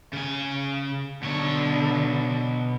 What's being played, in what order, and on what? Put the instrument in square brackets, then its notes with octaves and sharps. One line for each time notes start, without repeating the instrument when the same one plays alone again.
[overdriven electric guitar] C#3 G#5
[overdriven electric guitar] B2 C#5 [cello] D3